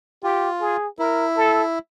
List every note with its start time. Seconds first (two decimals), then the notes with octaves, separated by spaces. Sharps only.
0.23 F4 G4
0.61 G#4
0.99 E4 A#4
1.37 A4